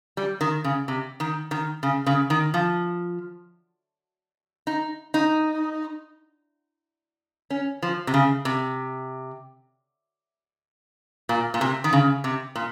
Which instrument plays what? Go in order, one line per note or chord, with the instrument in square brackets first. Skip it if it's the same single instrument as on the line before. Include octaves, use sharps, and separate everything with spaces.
[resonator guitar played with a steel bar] G3
D#3
C#3
C3
D#3
D#3
C#3
C#3
D#3
F3
D#4
D#4
C#4
F3
C3
C#3
C3
A#2
A#2
C3
D#3
C#3
C3
A#2